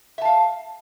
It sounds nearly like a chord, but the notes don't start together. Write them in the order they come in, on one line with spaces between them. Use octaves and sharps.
E5 A5 F5